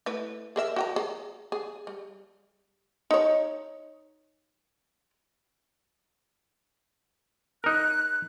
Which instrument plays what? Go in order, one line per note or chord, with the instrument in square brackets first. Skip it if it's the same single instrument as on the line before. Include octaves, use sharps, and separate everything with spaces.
[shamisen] A3 E4 B4
G#4 A#4 E5
F#4 G5 A#5
G#4
G#4
G3
D#4 C#5
[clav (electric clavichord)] D#4 A#4 [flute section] F#6